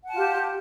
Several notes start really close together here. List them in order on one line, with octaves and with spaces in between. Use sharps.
F#5 A5 F4 G4